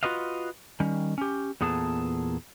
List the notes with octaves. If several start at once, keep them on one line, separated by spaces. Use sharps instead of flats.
F4 F#4 B4 D#5 F5
D#3 G3 C#4
C#4 G4
E2 A#2 B3 G#4 A4 A5